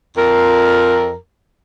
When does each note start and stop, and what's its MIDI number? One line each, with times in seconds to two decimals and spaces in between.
0.17 1.13 41
0.17 1.13 70